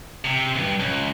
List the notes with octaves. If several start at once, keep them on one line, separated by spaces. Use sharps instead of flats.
C3
D2 G2
C#2